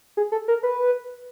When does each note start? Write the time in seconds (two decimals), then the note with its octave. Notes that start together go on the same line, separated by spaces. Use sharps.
0.17 G#4
0.32 A4
0.48 A#4
0.63 B4